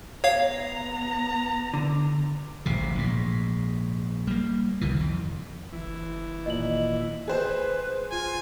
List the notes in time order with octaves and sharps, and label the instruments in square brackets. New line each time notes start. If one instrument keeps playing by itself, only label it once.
[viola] B3 A#5 [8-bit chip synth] C#5 F5
[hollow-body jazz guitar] D3
[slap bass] D1 A1 C3
A#1 G#2
G3 A#3
C2 D#3 E3
F2
[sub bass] F#1 [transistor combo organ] E3
[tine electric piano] A#2 D#3 [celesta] D#5 F#7
[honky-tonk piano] G#4 C5 [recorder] B4
[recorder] F4 [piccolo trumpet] G#5